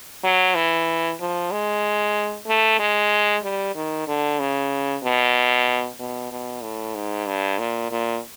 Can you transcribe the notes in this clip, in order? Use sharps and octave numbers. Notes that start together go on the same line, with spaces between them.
F#3
E3
F3
G#3
A3
G#3
G3
D#3
D3
C#3
B2
B2
B2
A2
G#2
G2
A#2
A#2